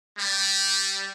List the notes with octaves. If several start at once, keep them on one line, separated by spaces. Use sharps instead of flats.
G3